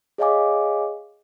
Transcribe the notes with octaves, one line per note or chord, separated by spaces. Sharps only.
G#4 C#5 D#5 F5 G#5 D6